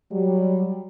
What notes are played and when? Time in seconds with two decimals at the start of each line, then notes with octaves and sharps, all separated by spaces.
0.12 F#3 G3